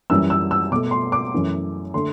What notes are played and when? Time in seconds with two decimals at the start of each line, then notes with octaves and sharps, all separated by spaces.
0.10 F#2 E3 G3 E6
0.30 E6
0.51 E6
0.72 B2 D6
0.75 A3
0.91 C6
1.12 D6
1.33 F#2 E3 A3
1.94 D3 A3 C6